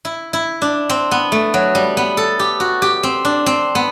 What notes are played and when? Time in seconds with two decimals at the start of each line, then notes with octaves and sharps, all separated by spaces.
0.05 E4
0.33 E4
0.62 D4
0.89 C4
1.11 B3
1.32 A3
1.54 F#3
1.75 G3
1.97 B3
2.17 A4
2.39 G4
2.60 F#4
2.82 G4
3.03 C4
3.25 D4
3.46 C4
3.75 B3